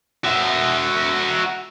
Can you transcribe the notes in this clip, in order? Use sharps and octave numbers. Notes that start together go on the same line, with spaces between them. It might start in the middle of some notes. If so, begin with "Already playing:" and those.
F#4 E5